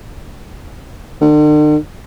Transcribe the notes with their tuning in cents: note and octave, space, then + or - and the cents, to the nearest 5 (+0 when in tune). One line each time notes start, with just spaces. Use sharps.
D3 +45